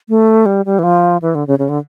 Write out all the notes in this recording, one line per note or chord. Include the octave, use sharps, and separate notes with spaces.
A3
G3
G3
E3
F3
E3
D3
C#3
C#3
D3